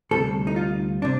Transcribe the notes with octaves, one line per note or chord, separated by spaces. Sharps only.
D2 C3 G3 A4
D#4
F4
C3 D4